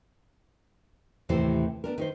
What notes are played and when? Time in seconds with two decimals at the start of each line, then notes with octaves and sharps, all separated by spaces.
1.29 D#2 A2 C3 E3 C5
1.84 B3 D4 A#4
1.98 D#3 D#4 C5